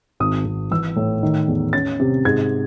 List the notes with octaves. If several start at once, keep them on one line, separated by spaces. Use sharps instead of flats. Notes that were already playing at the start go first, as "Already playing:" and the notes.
G#1 D#6
G#1
E3 E6
A2
D#3
E2
C#4 A6
C3
G#2 G#6